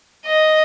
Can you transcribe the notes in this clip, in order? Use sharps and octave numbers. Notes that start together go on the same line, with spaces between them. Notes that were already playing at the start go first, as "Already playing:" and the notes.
D#5